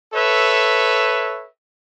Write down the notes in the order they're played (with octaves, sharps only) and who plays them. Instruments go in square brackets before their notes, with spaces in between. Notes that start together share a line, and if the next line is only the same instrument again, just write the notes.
[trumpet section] A4 B4 C#5 E5